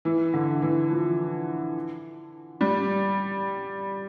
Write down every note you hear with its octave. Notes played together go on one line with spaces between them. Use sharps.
E3
D3
E3
F3
G3